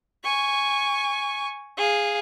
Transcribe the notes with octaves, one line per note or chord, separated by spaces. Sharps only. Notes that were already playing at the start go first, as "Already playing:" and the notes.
G#5 C#6
G#4 F5